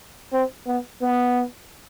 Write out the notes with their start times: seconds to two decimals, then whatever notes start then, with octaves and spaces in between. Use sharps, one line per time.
0.33 C4
0.67 B3
1.02 B3